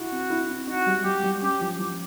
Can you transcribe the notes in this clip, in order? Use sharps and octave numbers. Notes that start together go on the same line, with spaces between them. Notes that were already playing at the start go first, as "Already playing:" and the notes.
Already playing: E4 F#4
C4
E4
C4
D#4 F#4
G3
G3 G4
G3
C#4 G4
F3
F3